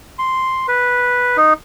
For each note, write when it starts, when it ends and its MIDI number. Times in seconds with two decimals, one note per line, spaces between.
0.19 0.66 84
0.68 1.37 71
1.37 1.53 63